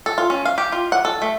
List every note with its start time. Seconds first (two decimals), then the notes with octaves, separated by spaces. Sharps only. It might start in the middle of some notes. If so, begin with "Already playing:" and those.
0.06 A4
0.18 F4
0.30 C#4
0.45 F5
0.58 G4
0.72 F4
0.92 F#5
1.05 A4
1.22 A3